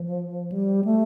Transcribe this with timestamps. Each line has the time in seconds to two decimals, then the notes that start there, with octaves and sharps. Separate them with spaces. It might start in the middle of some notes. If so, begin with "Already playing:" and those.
Already playing: F3
0.52 G3
0.85 A3